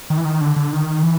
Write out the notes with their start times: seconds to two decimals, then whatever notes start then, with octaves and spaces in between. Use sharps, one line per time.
0.10 D#3
0.18 E3
0.25 D#3
0.41 D3
0.56 D3
0.73 D#3
1.03 E3